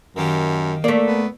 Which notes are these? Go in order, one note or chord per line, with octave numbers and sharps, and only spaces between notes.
F#2 D#3 A#3 G4
A#2 A3 A#3 D5
B3